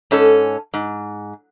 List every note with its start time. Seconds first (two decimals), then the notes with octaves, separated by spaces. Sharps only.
0.11 G#2 C#4 A4
0.74 G#2